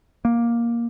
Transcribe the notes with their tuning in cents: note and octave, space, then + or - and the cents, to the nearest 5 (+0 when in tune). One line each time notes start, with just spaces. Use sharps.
A#3 +10